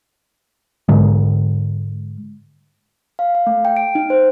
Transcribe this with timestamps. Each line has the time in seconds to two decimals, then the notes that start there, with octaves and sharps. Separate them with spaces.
0.89 G#2 D3 G#3
3.19 F5
3.35 F5
3.47 A3
3.65 G5
3.77 D7
3.95 D#4
4.10 C5